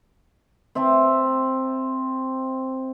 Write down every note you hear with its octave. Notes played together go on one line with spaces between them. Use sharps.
C4 E5 A5